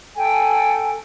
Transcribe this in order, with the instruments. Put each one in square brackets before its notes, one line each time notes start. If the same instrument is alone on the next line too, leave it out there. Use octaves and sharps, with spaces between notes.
[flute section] A4 G5 G#5